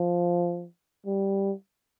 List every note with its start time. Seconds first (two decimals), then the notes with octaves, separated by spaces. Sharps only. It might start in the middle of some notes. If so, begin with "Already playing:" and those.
Already playing: F3
1.06 G3